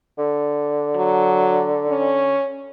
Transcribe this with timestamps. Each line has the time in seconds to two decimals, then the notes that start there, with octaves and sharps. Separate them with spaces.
0.18 D3
0.96 F#3
1.90 C#4